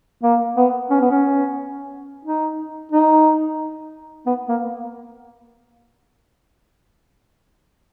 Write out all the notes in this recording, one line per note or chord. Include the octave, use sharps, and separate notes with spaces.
A#3
B3
C#4
B3
C#4
D#4
D#4
B3
A#3